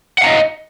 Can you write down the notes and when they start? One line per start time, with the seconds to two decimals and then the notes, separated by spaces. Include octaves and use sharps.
0.18 F#5
0.21 F5
0.24 A#5
0.26 D#5